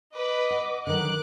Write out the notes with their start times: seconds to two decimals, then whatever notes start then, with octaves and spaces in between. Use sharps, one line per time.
0.15 B4 D#5 D6
0.50 F#5
0.87 D3 D#3 F#3 D6 F#6